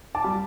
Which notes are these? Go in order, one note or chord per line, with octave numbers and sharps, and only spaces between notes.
A5 D6
G3